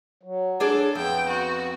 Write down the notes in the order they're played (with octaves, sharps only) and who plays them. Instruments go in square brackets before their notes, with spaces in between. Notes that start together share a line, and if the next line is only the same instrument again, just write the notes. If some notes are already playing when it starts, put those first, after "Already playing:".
[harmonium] F#3
[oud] D4 G#4 D5 [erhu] A4
[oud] F2 [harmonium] B3 [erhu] G5
[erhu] F#4